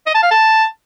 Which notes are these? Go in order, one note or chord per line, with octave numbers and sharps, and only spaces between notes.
D#5
A5
F5
A5